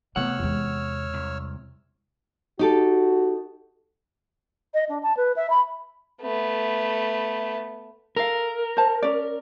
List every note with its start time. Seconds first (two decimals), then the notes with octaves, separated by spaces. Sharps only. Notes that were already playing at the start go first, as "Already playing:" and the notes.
0.16 C3 A3 B3 C#5 F#5 E6 F6
0.39 E2 G#3
1.14 C2
2.59 D#4 F#4 G4 A4
4.74 D#5
4.89 D4
5.03 A5
5.17 B4
5.36 E5
5.50 B5
6.21 A3 B3
8.16 A4 A#4 F5
8.77 C5 A5
9.03 C#4 D5